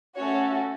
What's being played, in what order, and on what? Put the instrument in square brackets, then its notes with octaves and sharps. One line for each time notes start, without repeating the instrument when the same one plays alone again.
[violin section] A3 C#4 F#4 A4 C#5